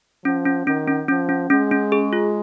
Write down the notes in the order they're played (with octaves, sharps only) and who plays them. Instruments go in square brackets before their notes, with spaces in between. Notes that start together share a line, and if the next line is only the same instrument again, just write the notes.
[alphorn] F3 [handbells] C#4
[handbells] C#4
[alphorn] D#3 [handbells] C#4
[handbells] C#4
[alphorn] F3 [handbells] C#4
[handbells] C#4
[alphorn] G#3 [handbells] C#4
[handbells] C#4
G#4
F4